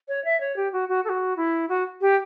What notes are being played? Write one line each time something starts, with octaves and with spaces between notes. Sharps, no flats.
C#5
E5
C#5
G4
F#4
F#4
A4
F#4
E4
F#4
G4